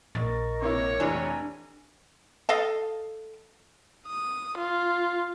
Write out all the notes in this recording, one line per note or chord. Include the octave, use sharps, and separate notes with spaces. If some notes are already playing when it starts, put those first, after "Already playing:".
A#1 A#4 D#5 C#6 A6
C3 A#3 E4 C#5
F1 A#1 E3 D4 G#5 A#5
A4 D#5 F5
D#6
F4